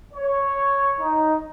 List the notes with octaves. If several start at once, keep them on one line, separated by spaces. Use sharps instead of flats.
C#5
D#4